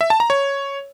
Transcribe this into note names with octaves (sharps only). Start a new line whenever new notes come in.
E5
A5
A#5
C#5